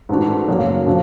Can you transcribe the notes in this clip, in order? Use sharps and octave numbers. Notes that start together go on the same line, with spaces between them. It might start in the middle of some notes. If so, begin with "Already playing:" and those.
G#2 E3 A3 D4 F#4
F#2 C#3 F#3 A#3
C#3 F3 A3 D4 F#4